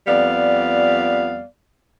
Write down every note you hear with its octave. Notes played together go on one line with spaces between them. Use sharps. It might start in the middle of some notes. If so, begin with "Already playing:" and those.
F2 G3 B3 D5 F5